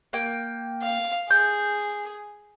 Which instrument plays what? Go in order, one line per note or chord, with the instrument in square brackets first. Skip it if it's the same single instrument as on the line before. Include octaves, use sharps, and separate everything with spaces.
[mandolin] A#3 G5
[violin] F5
[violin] G#4 [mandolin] G6